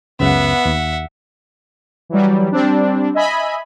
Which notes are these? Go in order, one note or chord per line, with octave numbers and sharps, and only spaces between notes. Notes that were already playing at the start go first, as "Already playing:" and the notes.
C#2 F#2 C#3 B3 E5 F#5
D#2
E3 F#3 G3
G3 C4 D4
D#5 E5 G#5 B5